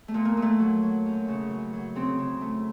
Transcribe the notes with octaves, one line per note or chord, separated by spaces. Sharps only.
A3
A#2
A#3
A#2
A3
F#3
F#3
F#2
C#3
F#2
F#3
C#3 C4
C#3
A3